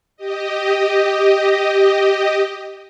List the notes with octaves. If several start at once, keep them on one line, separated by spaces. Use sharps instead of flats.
G4 D#5